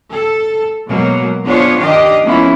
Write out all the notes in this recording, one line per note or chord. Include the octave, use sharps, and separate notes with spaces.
A4
B2 F#3 G#3 A#3
B3 D4 F4 G#4 C5 C#5
D#3 D4 G4 D#5 F5
F3 A#3 B3 C#4 E4